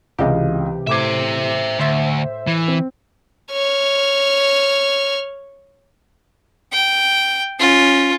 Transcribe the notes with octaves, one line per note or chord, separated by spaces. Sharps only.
C#2 C3 E3 G4 D#5 F5
A2 C5 E5 D6 G#6
D2 C5 E5
E3
C4
C#5 F6
G5
C#4 F4